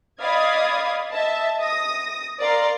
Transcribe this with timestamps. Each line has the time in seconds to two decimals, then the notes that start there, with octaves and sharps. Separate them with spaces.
0.21 D5 D#5 F5 B5 D#6 G#6
1.13 D#5 E5 A5
1.61 D#6 A#6
2.41 A#4 D5 F5 A#5 C6